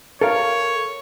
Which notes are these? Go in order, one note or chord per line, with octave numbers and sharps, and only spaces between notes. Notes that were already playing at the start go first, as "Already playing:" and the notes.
A4 A#4 C#5 F5